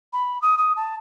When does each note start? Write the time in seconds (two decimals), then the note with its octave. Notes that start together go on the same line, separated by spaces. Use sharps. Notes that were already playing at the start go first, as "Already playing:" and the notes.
0.13 B5
0.42 D#6
0.58 D#6
0.76 A5